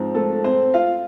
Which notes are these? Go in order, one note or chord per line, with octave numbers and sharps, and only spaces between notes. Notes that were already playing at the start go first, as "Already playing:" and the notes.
Already playing: G#2 F3 C4
A3 A4
C4 C5
F4 F5